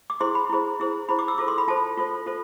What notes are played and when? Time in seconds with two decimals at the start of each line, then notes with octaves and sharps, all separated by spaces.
0.10 D6
0.20 E4 G#4 C5 C6
0.35 B5
0.49 E4 G#4 C5
0.80 E4 G#4 C5
1.09 E4 G#4 C5 B5
1.19 D6
1.28 E6
1.38 F4 A4 C5 D6
1.48 C6
1.58 B5
1.68 F4 A4 C5 A5
1.97 F4 A4 C5
2.26 F4 A4 C5